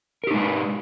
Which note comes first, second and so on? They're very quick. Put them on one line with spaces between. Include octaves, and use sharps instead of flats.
A#4 G4 D#4 G#3 B4